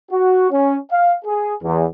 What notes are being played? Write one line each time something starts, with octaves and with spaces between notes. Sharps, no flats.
F#4
C#4
F5
G#4
E2